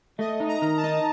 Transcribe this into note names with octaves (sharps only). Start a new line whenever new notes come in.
A3 D#5
D#4
A#5
D#3
A5
D#4